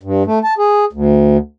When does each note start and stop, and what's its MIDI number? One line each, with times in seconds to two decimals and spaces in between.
0.03 0.23 43
0.26 0.39 57
0.44 0.54 81
0.58 0.85 68
0.93 1.37 38